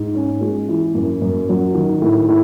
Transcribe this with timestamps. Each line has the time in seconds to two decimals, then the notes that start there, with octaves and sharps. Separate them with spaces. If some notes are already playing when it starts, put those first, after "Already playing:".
Already playing: G#2
0.15 C#4
0.41 G#3
0.69 E3
0.94 F#2
1.21 F#2
1.49 F#3
1.74 D#3
2.02 A2
2.28 A2